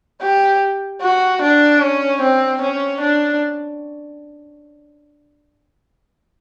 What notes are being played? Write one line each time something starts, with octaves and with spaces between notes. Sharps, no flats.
G4
F#4
D4
C#4
C4
C#4
D4